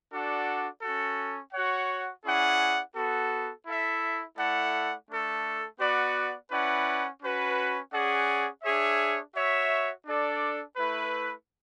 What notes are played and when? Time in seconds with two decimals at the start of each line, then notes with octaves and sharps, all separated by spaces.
0.11 D4 F#4 A4 D5 F#5
0.82 C#4 F#4 A4
1.53 F#4 C#5 F#5
2.23 C#4 E4 G#4 D5 F#5
2.95 B3 F#4 A4
3.65 E4 A4 E5
4.37 A3 E4 A4 D5 F#5
5.08 A3 D4 A4
5.79 B3 F#4 B4 D5 F#5
6.50 C#4 E4 B4 D5 F#5
7.22 C#4 F#4 B4
7.92 C#4 G#4 D5 F#5
8.62 D4 G#4 C#5 E5
9.34 F#4 C#5 E5
10.05 D4 A4 D5
10.76 A3 E4 B4